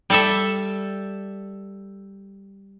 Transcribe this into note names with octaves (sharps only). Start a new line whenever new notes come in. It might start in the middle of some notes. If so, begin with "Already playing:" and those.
G3 A4 E5